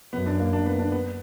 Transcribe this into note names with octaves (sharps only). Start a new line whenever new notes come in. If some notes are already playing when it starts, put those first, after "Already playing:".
F#2 B3
D4
A#3
D4
B3
D4
B3